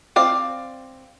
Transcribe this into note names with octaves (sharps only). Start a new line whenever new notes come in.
C4 D5 F5